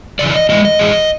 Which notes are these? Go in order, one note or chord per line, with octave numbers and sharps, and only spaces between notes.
F#2 C#3 E3 D5
D#5
A2 E3 G#3 D#5
D#5
A2 E3 G#3